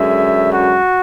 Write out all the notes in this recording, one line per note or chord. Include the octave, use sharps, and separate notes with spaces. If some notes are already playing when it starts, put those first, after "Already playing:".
Already playing: F#2 D3 G#3 E5
F#4